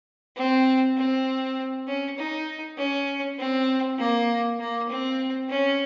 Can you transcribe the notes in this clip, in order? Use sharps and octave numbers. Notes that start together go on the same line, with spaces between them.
C4
C4
C#4
D#4
C#4
C4
A#3
A#3
C4
C#4